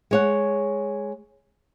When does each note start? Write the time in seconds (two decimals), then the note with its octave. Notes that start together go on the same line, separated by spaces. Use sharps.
0.11 G#3 C#5 F#5